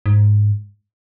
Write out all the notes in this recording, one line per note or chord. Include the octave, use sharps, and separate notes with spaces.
G#2